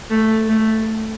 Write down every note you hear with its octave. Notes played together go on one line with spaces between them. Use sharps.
A3
A3